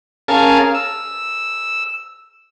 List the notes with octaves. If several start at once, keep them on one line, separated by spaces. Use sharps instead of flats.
C#4 G#4 A#4 F5 A5
E6